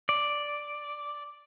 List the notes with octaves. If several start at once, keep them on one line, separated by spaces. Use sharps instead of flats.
D5